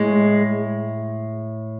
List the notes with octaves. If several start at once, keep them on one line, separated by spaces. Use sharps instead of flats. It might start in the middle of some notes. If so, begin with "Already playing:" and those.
Already playing: A2 G#3